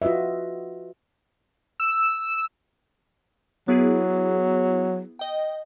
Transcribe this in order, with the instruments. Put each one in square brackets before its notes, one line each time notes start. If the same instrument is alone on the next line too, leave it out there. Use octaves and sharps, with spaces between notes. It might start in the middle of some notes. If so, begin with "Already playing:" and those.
[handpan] F4 F#4 B4 D#5 E5
[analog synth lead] E6
[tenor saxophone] F#3 [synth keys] B3 E4 G#4
[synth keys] D#5 G5